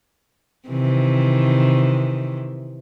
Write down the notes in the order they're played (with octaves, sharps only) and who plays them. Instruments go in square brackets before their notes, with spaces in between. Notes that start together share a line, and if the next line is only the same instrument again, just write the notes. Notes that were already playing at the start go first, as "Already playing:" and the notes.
[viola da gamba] C3 D#3 E3